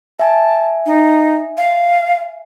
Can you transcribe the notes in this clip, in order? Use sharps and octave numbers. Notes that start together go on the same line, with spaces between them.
E5 G#5 A5
D#4
F5